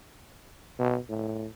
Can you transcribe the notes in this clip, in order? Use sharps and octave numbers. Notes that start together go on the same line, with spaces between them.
B2
A2